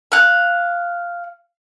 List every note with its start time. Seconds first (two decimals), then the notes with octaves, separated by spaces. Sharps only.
0.12 F5 F#6